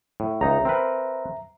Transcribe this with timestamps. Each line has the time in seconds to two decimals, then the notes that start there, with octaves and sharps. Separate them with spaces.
0.20 A2
0.41 C#2 D#4 E5 A#5
0.65 C4 A#4 B4